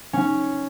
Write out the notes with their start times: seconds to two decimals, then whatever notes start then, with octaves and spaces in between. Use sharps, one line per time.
0.13 C#4